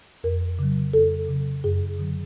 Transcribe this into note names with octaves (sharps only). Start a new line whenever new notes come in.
F2 A#4
C#3 F#3
F2 A4
C#3 F#3
F#2 G#4
D3 F#3